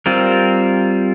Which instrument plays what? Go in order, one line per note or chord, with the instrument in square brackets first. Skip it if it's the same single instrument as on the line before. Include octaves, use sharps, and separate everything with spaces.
[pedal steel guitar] G3 C4 F4 A#4